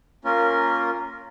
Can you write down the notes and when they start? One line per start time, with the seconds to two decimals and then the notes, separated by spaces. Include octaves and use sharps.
0.25 A#3 C#4 F4 A#4